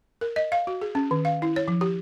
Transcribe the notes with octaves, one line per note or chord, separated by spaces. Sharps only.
A#4
D#5
F5
F#4
G#4
C#4
D#3
F5
E4
C#5
F3
G4